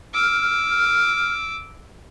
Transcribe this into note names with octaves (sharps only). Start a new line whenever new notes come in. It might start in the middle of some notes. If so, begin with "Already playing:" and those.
D6 E6 F6